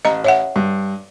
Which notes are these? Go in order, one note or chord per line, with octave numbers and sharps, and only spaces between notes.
A1 D#5 A#5
C#5 E5 F#5
G2